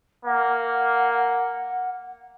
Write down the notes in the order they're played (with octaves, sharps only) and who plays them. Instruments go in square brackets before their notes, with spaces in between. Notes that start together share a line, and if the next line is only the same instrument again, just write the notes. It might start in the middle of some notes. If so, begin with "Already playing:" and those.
[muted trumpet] A#3 [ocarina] F#5